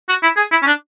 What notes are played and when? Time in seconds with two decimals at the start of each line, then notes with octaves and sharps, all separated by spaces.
0.09 F#4
0.23 E4
0.37 G#4
0.52 E4
0.62 C#4
0.67 D4